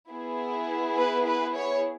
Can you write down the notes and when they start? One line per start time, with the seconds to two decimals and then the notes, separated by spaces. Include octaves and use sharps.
0.11 B3 E4 G#4
0.98 B4
1.26 B4
1.55 C#5